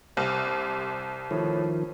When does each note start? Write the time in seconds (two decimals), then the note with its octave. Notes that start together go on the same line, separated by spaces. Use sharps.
0.17 C2 C3
1.31 A2 D#3 F3